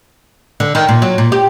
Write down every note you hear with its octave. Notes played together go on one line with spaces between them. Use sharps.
D3
D#3
A#2
F#3
A#2
G4